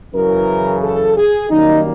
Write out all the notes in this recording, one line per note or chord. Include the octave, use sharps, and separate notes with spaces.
F#2 C#3 E3 A#4
A4
G#4
F#2 D#3 G3 A#3 D#4